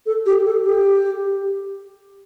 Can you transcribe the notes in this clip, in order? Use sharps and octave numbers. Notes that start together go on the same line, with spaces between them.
A4
G4
A4
G4